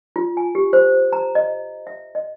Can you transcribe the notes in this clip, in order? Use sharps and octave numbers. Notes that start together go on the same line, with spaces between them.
F4
G#5
G4
C5
A#5
D#5
E5
D#5